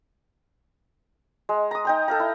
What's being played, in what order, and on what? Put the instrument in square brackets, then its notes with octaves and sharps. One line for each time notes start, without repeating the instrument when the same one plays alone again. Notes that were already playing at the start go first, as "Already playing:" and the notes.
[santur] G#3
A#5 D#6
D#4 G5 A#5
A4 F5 A#5
E4